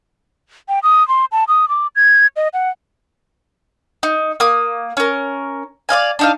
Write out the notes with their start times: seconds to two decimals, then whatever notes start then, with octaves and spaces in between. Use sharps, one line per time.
0.69 G5
0.83 D#6
1.08 C6
1.32 A5
1.48 D#6
1.69 D6
1.96 G#6
2.36 D#5
2.54 F#5
4.03 D#4
4.40 A#3 D#6
4.97 C#4 A#4
5.89 D5 D#5 F5 G#5
6.19 D4 D#4 F5